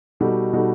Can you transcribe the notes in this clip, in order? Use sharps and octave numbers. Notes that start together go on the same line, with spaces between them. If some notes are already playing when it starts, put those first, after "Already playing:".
B2 G3 D#4 F#4 A4
B2 G3 D#4 F#4 A4